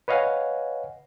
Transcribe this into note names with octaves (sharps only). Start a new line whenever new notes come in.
B4 C#5 D#5 F5 F#5 G#5